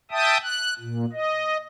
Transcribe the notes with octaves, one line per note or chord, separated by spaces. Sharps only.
E5 G5 A5 D#6
F#6
A#2
D#5